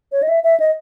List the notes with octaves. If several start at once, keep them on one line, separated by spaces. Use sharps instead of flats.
C#5
D#5
E5
E5
D#5